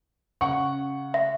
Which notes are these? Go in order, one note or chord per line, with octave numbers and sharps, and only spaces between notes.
C#3 F#5 C#6
E5